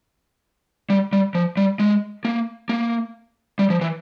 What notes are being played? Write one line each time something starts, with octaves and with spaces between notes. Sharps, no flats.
G3
G3
F3
G3
G#3
A#3
A#3
G3
F3
E3